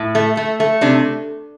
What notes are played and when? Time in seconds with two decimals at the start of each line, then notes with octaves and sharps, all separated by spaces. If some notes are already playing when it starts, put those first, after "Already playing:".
Already playing: A2
0.15 A3
0.37 A3
0.60 A3
0.81 C3 D4